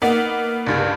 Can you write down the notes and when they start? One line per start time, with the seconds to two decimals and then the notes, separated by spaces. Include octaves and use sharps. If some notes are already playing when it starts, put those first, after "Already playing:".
0.02 A#3 B3 D#4 A#4
0.67 C#2 G2